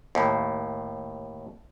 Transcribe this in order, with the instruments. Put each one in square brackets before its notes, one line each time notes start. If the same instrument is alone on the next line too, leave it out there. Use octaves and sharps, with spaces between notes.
[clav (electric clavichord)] D#2 A2